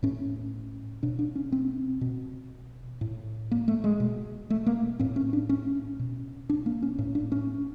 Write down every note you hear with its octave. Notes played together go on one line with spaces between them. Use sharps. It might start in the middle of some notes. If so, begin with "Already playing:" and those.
A2 C#4
B2 D4
D4
C#4
C4
B2
A2
A#3
A3
G#3
B2
A3
A#3
A2 C4
C#4
D4
C#4
B2
D4
A#3
C#4
A2 C#4
D4
C#4